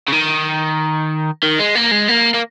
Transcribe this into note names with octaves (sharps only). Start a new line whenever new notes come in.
C#3
D#3
D#3
G#3
A#3
G#3
A#3
A#3